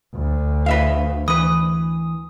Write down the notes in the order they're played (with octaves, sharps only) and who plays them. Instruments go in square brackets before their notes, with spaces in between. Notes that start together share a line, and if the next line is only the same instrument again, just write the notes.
[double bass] D2
[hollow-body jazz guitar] B4 E5 F5
[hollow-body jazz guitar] E3 B4 [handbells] D#6